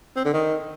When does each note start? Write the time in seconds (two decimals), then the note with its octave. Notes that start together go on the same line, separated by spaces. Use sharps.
0.16 C4
0.25 D3
0.34 D#3